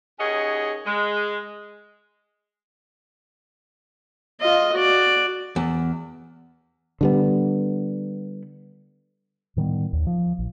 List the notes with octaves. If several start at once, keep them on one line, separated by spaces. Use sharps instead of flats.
D#2 C#4 G#4 C#5 D#5 F#5
G#3
F4 D#5
F#4 D5
E2
D3 G3 B3
A2 D#3 G3 B3
D#2
F3
A#1